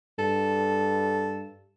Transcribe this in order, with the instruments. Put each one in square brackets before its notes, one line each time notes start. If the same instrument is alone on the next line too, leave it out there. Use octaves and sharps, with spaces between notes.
[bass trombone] G2 [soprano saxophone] A4